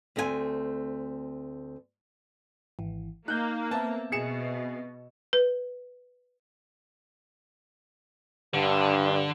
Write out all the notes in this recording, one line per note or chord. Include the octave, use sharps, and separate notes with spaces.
D2 A3 C4 D#5 G#5
G#1 E3
A#3 D#4 F#6 G6
B3 C4 E5 A5
B2 G#4 C#7 E7
B4
G2 D3